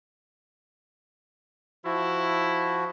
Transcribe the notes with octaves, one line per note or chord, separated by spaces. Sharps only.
F3 E4 F#4